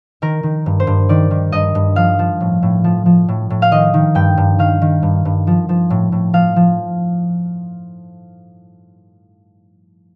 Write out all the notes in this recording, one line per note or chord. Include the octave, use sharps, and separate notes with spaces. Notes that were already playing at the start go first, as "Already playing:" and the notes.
D#3 A#4
D#3
G2
C5
G2
D#3 D5
D#3
G2 D#5
G2
F3 F5
F3
A2
A2
F3
F3
A2
A2
F5
D#3 D#5
D#3
G2 G5
G2
D#3 F5
D#3
G2
G2
F3
F3
A2
A2
F3 F5
F3